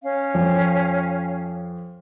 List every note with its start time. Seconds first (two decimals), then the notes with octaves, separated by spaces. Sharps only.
0.02 C#4 F5
0.35 F2